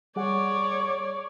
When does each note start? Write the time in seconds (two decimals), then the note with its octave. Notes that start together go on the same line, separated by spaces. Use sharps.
0.16 G3 G#4 C#5 D5 F#5